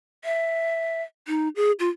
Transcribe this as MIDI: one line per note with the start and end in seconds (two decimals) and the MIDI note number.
0.25 1.02 76
1.28 1.49 63
1.56 1.72 68
1.79 1.89 65